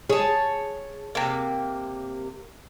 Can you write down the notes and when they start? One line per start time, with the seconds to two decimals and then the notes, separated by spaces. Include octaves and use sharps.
0.10 G#4 C#5 A5
1.15 C3 A#3